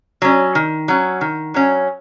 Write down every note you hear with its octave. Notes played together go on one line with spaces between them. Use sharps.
F#3 C#4
D#3
F#3 C#4
D#3
F#3 C#4